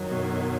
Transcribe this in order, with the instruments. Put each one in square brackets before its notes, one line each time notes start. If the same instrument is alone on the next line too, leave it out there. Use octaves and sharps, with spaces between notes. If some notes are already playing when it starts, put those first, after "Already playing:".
Already playing: [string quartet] F#2 D#3 F#3
[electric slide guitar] B2